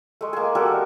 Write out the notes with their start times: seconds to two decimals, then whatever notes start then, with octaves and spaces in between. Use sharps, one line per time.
0.21 G#3 A3
0.33 A#3 G#4
0.55 G3 F#4 A4 A#4